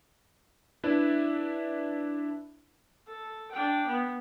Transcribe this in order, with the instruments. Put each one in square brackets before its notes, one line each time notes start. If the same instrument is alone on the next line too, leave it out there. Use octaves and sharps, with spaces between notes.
[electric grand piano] D4 E4 B4 D5 E5
[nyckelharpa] A4
D4 G5
B3